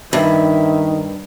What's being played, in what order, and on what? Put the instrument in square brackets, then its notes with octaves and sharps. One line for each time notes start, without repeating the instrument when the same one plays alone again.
[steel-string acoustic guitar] G2 [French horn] D#3 [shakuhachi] E5